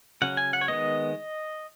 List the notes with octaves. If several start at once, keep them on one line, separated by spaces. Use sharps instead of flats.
C#3 F#3 C#4 F#5
G#5
F#5
C#5
D#3 G#3 B3 D#5